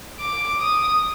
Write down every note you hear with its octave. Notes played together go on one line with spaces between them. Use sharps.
D6
D#6